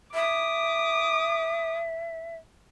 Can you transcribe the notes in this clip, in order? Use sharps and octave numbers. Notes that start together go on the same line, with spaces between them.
E5 D6 D#6